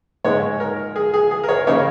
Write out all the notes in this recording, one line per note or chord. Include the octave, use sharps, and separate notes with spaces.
G#2 G#3 D#4 C#5
A#4
G#4
G#4
G#4
A#4
C#5
C#3 A#3 D#4 C#5